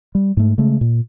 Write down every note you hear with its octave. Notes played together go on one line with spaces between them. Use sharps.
G3
G#2 A3
C#3 G#3 A3
A#2